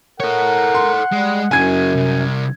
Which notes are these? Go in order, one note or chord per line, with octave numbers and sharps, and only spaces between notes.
A4 A#4 C#5 F#5
C6
G3 G#3
F#2 C#3 F#3 G#5 G#6
C2